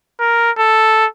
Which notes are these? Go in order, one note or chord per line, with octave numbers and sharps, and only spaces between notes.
A#4
A4